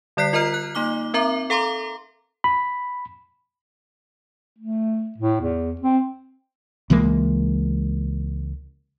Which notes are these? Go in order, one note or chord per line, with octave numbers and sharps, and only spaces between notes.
D3 G3 D5 F#6 B6 C7
F4 A#4 D#5 A#5 F6
F#6
A#3 D#4 D6 G7
C4 A#4 E5 A#5 D6
A4 F5 A#5 C6 D6
B5
A3
A2
E2
C4
C#2 E3 G#3 A#3